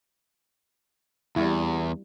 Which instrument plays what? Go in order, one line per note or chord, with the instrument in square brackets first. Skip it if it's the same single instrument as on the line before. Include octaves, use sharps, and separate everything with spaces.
[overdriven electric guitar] E2 [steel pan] G3 E4